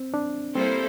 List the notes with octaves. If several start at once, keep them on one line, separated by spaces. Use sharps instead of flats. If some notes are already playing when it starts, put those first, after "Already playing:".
Already playing: C4
D4
G3 A#3 C4 E4 A4 C5